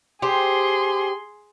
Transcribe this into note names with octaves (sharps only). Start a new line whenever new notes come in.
G4 G#4 C5 C6